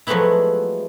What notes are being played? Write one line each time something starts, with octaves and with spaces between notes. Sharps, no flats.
F3 F#3 G#3 A3 B3 E4